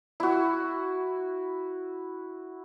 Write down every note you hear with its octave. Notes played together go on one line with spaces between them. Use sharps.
E4 F#4